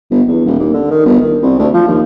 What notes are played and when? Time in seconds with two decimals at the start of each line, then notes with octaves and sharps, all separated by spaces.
0.11 G1
0.28 E2
0.46 D#1
0.59 D#2
0.74 D3
0.91 D#3
1.06 G1
1.21 D#3
1.42 C2
1.59 D2
1.74 F3
1.87 D#2